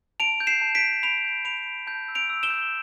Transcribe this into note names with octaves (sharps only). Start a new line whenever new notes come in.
A5 D7 F7
G6
C7 E7
A5
B6 D7
G6
B5 D7 F7
G6
B5 D7 F7
B5
A5 G6
E6
D7 F7
E6
E7 G7
G6